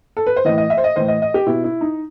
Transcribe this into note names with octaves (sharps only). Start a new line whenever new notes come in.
A4
B4
C5
A2 E3 D#5
D#5
E5
C5
D#5
A2 E3 C5
D#5
D#5
G4
B2 E4
E4
D#4